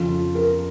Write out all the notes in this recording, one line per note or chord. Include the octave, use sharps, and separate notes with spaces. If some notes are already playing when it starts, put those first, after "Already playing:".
Already playing: F2 C#3 F3 F4
A#4